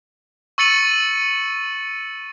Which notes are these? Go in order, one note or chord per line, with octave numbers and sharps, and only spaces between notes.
C#6 E6 A6 C#7 D#7 F#7